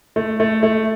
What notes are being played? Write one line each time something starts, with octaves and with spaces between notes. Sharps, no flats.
A3
A3
A3